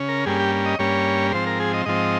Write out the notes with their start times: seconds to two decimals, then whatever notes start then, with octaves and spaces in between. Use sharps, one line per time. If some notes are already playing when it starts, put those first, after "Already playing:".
Already playing: C#3 C#4
0.08 A#4
0.25 G2 G3 A#3 C#4 G#4
0.39 G4
0.66 D#5
0.79 G2 G3 A#3 C#4 C#5
1.32 G#2 F3 C4 C5
1.47 A#4
1.60 G#4
1.73 D#5
1.86 G#2 F3 C4 D#5